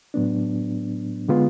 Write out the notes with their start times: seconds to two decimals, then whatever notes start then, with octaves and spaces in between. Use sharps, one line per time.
0.14 A2 F#3 B3 D4
1.28 D3 G#3 B3 F4